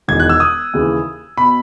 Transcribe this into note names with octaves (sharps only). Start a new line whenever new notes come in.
E1 E2 D#3 G#6
F#6
E6
D#6
D#2 C#3 E3
B2 B5